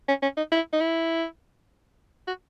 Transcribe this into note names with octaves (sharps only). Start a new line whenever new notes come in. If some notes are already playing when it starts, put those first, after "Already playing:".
C#4
C#4
D#4
E4
D#4
E4
F#4